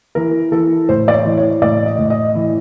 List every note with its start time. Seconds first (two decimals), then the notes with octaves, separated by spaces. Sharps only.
0.15 E3 A#4
0.52 E3 A4
0.89 A2 C5
1.08 D5
1.13 C#5
1.25 E3
1.37 C#5
1.62 A2 D5
1.86 D#5
1.99 A2
2.10 D#5
2.35 E3